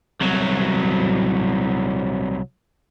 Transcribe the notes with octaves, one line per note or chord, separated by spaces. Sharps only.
C2 F#3